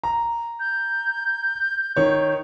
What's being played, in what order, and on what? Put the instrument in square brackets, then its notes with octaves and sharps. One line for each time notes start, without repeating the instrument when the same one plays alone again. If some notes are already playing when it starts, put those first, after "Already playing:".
[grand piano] A#5
[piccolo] G6
[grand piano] D#3 C#5